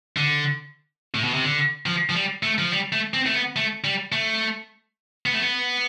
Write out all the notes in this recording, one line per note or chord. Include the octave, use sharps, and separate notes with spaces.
D3
A2
B2
C3
D3
F3
F3
G3
A3
F3
G3
A3
C4
A3
B3
A3
G3
A3
B3
A3
B3